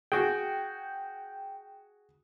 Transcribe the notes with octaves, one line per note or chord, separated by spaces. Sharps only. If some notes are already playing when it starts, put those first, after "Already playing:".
F#4 G#4 G5